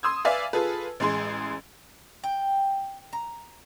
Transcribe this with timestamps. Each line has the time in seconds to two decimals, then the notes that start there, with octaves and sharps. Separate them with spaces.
0.03 C6 D#6 E6 G#6
0.25 B4 D5 E5 F5 G#5
0.53 F4 G#4 A4 B4
1.00 A1 G#3 G#4 C6
2.24 G5
3.13 A#5